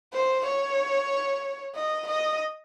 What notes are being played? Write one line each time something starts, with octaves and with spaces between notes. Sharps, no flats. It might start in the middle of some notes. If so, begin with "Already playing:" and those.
C5
C#5
D#5
D#5